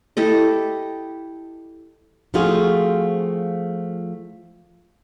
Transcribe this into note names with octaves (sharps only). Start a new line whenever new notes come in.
E4 G4 A4 D#5
F3 A3 C4 F4 F#4 G#4